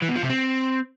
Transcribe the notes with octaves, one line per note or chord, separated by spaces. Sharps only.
E3
B2
F3
C3
C4